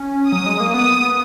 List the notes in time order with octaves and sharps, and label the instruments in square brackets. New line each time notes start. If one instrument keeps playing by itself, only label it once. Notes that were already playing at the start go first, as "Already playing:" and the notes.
Already playing: [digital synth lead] C#4
[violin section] D#6
[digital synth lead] F#3
G#3
A#3
[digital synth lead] B3 [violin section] D#6